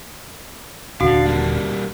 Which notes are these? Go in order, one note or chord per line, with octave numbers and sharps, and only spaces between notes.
D#1 D3 D4 F#4 F5
G3 A#3